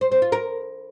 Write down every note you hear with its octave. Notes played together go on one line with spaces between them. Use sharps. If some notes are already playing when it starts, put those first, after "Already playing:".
C5
C4
F4
A#4